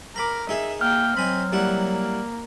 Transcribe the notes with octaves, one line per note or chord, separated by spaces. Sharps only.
A#4 A#5 B5 D6
D#4 G#4 E5
A#3 G5 F6
F#3 C4 D#5 G#5 B5
G3 A#3 E4 F#5